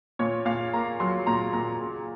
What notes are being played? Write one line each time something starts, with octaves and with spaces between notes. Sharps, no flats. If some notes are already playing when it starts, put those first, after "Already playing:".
A#2 C#5
A#2 F5
A#3 A#5
F#3 C6
A#2 A#5
A#2 A#5
C#3